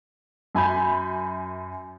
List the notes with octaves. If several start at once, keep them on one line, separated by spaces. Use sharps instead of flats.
F#2 G#5 B5 G6